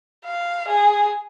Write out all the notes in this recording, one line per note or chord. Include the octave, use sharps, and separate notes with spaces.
F5
G#4